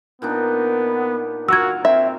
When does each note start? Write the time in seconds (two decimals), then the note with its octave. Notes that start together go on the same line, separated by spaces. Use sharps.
0.22 A#2 B3 D4 D#4
1.48 F4 F#4 A#4 F5 E6 G#6
1.85 C4 E5